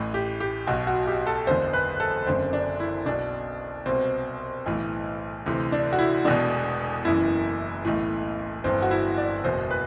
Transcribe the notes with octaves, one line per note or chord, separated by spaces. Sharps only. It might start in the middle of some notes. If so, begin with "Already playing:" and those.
Already playing: A1 A2 E3
G4
G4
B1 B2 F#4
F#4
G4
A4
F#1 E2 D3 C5
B4
A4
F#1 F#2 D3 C4
D4
E4
B1 B2 D4
C2 B2 C4
B1 A2 E3
D2 C3 E3
D4
F#4
E4
E1 E2 B2 D4
F#1 F#2 E3 E4
B1 A2 E3
G1 G2 E3 C4
F#4
E4
D5
F#1 E2 B2 C5
B4